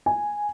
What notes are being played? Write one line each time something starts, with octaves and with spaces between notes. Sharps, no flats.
G#5